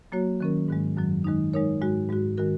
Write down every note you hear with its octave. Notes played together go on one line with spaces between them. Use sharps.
F#3 A#3 F#4 C#5
D#3 F#3 C#4 A#4
G#2 D#3 G#3
F#2 D#3 F#3
D#3 G#3 D#4
G#3 D#4 A#4 C#5
G#2 G#3 F#4
G#2 G#3 F#4
D#3 G#3 F#4 A#4